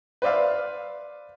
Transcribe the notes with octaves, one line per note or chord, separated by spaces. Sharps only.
B4 C5 D5 E5 F5